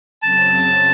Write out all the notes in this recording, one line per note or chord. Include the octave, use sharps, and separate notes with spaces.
F#2 C#3 F#3 C4 A5